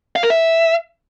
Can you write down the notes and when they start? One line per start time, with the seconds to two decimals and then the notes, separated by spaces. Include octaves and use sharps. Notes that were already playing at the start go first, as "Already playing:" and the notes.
0.16 F5
0.23 A#4
0.30 E5